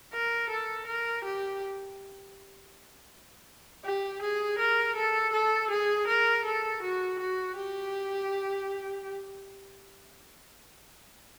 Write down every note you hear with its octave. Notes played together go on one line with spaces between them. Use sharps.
A#4
A4
A#4
G4
G4
G#4
A#4
A4
A4
G#4
A#4
A4
F#4
F#4
G4